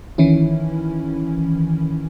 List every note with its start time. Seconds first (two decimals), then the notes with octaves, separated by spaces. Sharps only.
0.18 D#3 E3 C#4 E4